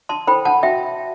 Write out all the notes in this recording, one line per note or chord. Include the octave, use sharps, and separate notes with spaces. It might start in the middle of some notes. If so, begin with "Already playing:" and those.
A5 C6
E4 A4 C5 G5 B5
F#5 A5
F#4 E5 G5